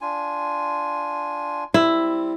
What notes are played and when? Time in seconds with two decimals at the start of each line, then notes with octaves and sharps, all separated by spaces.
0.01 D4 F4 G#5
1.74 G3 C4 E4